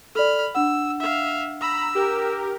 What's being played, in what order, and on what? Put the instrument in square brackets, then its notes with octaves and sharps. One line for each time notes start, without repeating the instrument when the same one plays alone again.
[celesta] A4 D5 [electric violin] B5 F6
[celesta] D4 F#5 [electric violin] E6
[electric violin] E5 F5
[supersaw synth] A#5 B5 [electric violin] E6
[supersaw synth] G4 A#4